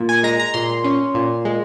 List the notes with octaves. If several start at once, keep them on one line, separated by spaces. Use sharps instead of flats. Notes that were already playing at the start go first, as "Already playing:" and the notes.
Already playing: A#2
G#5
G#3 A#5
A#5
A#2 C6
C#4
A#2
G#3